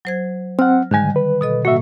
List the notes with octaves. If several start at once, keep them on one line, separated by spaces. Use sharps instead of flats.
F#3 C5 G#6
C4 F#5 F6
G#2 D3 D#3 G3 G#5
B4
B2 A4 D#5
A2 A#3 F#4 E5